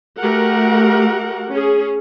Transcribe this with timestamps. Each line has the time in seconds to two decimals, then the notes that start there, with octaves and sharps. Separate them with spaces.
0.19 A3 F#4 G4 A#4 F#5
1.52 C#4 G#4